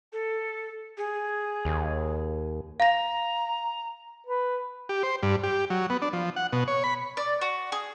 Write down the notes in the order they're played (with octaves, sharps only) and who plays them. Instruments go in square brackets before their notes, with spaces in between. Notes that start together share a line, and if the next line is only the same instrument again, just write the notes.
[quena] A4
G#4
[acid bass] D#2
[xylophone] F5 A#6 [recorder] A#5
[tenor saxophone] B4
[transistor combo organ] G4
C5
G2
G4
F#3
B3
D4
F3
F#5
B2
C#5
B5
[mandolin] D5
F#4
G#4